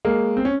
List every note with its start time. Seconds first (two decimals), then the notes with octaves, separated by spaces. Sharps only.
0.05 G#3 A#3
0.37 C4
0.45 C#4